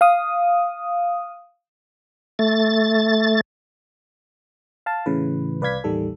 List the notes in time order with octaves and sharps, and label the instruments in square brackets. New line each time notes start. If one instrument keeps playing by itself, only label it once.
[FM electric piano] F5 D#6
[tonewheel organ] A3 A6
[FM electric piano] F5 A5
A2 C#3 E3 B4
C2 B4 D5 F5 G#6 B6
A1 D#2 D#3 G3 A4